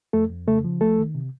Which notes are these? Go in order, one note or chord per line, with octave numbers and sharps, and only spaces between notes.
F2 A3 A4
F2
C#3 A3 A4
F3
C2 A3 A4
D#3
C3